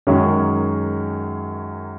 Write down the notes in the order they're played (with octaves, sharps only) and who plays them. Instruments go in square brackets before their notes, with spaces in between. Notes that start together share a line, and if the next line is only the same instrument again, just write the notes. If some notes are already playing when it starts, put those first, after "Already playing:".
[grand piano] F#2 D#3 G#3 C#4 G#4